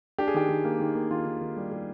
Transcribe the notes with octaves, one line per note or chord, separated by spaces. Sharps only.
D4 G4
G#4
D#3 G4
D#3
A#3
D#3
A#3
D#3 F4
D#3
D#3
G3
G3